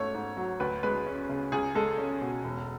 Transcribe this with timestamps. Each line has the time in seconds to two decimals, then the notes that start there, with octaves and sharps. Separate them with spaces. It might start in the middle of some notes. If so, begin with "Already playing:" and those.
Already playing: G#2 A3 C#5
0.14 G#2
0.37 F#3
0.60 D2 B4
0.83 G#3 B4
1.06 C#4
1.29 C#3
1.52 C#2 G#4
1.75 G#3 A4
1.98 C#4
2.21 B2
2.44 E1